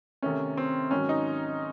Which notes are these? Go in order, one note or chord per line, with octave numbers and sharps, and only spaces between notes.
C3 D#3 A3 C#4
C4
G#2 D#3 F#3 C#4
D#4